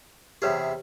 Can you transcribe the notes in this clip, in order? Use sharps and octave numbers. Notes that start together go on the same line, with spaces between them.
E2 C3 G4 G#4 B4 C#5